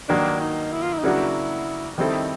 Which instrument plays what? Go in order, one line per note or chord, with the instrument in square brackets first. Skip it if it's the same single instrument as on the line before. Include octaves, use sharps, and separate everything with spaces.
[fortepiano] G2 D#3 F#3 A#3 [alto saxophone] D4
[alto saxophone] D#4
E4
F4
E4
D#4
[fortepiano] C#3 F#3 A#3 D4 F#4 [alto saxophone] E4
[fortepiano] D#3 G3 C4 E4 A4 [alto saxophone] D#4